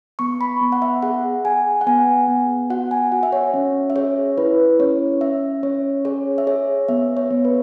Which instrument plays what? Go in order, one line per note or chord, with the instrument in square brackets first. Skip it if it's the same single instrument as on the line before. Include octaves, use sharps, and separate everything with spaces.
[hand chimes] B3 C#6
B5
B3
F#5
E5
G#4 F#5
G#4 G#5
F#5
B3 G#5
B3
F#4 F#5
G#5
F#4 F#5
E5
C#5
C#4
E5
G#4 C#5
E4 B4
C#4 C#5
C#4 E5
C#4 C#5
G#4 C#5
E5
G#4 C#5
B3 E5
C#5
B3
B4